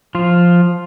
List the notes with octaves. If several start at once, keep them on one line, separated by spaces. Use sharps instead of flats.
F3 F4